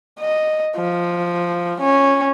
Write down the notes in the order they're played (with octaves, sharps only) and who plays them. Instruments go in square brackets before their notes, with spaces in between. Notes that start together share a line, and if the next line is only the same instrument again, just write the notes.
[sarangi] D#5
F3
C#4